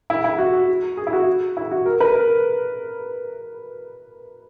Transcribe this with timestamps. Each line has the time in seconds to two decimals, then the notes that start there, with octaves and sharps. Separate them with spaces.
0.10 E4
0.24 E4
0.38 F#4
0.53 F#4
0.97 G#4
1.07 E4
1.13 F#4
1.57 E4
1.71 F#4
1.86 A#4
2.00 B4
2.15 A#4